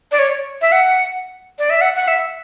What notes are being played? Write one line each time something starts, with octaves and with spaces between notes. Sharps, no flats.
D5
C#5
E5
F#5
D5
E5
F#5
F#5
E5